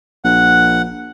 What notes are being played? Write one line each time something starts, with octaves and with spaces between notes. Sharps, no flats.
A#1 F#5